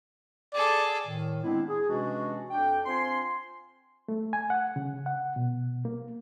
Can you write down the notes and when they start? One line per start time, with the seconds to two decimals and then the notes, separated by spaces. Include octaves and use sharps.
0.54 G#4 A4 D5
1.05 A2 D#3
1.43 G#3 B3 C4 D4 E4
1.68 G#4
1.89 C3 E3 G#3 C#4 D4 F#4
2.51 F2 D4 G5
2.86 C4 F4 C5 G#5 C6
4.08 A3
4.33 G#5
4.50 F#5
4.76 C#3
5.06 F#5
5.36 B2
5.85 A#3